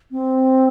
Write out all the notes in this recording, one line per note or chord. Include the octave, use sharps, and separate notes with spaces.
C4